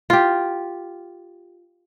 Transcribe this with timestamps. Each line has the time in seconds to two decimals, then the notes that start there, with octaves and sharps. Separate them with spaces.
0.10 F4 G4